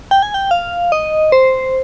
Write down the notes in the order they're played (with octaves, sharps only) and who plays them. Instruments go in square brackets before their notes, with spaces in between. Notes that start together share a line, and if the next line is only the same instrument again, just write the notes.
[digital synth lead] G5
G#5
G5
F5
D#5
C5